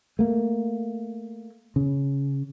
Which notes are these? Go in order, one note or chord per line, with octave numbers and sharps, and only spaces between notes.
A3 A#3
C#3